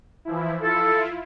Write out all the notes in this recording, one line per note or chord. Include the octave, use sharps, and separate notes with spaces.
E3 F3 E4
E4 F4 A4